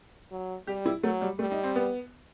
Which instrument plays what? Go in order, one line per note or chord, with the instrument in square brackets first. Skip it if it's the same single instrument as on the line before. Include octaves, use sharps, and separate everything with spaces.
[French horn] F#3
[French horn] G3 [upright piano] G4
[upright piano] E4
[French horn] F#3 [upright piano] A3
[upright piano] G3
[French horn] G3 [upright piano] A3
[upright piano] D#4
C4
B3